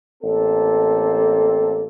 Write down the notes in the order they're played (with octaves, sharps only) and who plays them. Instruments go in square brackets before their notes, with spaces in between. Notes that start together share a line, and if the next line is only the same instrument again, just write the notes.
[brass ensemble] A1 A#3 C4 A4